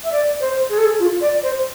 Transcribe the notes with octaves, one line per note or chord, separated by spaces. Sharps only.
E5
D5
C5
G#4
A4
G#4
F4
D5
C5